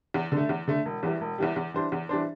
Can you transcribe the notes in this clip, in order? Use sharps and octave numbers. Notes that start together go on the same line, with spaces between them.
E2
D3
A3
E2
D3 A3
E1
E2 E3 G3
E1
E2 E3 G3
E2
E3 G3 D4 C5
E2
E3 G3 D4 C5